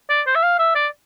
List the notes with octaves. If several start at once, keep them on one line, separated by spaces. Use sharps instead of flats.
D5
C5
E5
F5
E5
D5